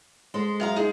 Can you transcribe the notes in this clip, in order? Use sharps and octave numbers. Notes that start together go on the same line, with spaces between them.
G#3 A4 C5
F#2 F5 A#5
D#4 G#4